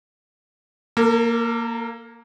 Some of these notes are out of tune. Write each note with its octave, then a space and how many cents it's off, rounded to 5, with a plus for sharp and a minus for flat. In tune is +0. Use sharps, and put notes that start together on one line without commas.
A#3 +0 A4 +45